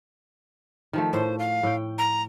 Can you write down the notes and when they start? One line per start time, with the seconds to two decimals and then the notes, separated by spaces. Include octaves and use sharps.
0.93 D#3 F3 A3
1.13 A2 C5
1.39 F5
1.63 A2 G5
1.98 A#5